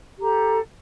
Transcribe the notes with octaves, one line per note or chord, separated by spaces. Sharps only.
G4 A4 A#5